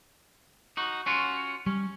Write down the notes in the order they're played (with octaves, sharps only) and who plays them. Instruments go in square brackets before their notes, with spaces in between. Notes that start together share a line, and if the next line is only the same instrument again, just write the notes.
[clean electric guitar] D#4 F#4
C#4 F4 F#4
[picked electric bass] G3 [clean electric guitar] C#4